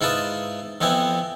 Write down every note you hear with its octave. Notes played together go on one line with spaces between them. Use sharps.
G#2 E4 F4 B4 A5 D#6
F2 B3 C4 E4 G#5